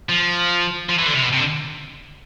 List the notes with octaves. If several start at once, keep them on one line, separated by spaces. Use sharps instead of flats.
F3
F3
E3
D3
C3
B2
C3
D3